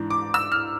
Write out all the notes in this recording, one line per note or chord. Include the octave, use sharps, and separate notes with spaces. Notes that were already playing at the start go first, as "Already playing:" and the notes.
Already playing: G#2 E3 D4
D6
E6
F6